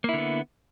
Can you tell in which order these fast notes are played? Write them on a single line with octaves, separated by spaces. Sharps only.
A#3 E4 D3 B3